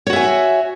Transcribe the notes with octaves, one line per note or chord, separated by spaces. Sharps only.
F#4 C#5 E5 G#5